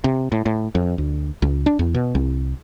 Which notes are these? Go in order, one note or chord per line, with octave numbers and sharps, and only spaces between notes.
C3
A2
A2
F2
D2
C#2
D4
E2
B2
C2